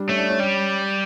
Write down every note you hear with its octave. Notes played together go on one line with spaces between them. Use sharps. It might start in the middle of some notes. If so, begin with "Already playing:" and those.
Already playing: G3 D4
A3 C#4
D4
C#4
G3